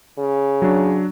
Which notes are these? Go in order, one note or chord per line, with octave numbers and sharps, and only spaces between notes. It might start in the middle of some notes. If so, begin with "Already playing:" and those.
C#3
F#3 D4